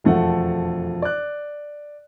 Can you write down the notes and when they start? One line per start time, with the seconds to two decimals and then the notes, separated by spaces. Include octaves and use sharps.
0.04 E1 F2 A3 F#5
1.02 D5 F#6